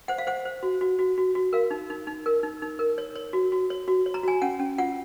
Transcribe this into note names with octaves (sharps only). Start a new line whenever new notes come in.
C5 F#5
F5
C5 F#5
C5
F#4
F#4
F#4
F#4
F#4
A#4 F5
D#4
D#4
D#4
A#4
D#4
D#4
A#4
C#5
C#5
F#4
F#4
C#5
F#4
C#5
A#5
F#4 G#5
C#4 F#5
C#4
F4 F#5